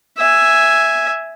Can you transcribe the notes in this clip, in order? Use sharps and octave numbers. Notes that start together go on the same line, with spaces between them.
E5 G#5